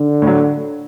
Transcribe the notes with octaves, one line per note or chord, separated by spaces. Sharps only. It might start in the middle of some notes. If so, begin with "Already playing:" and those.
Already playing: D3
A2
F#3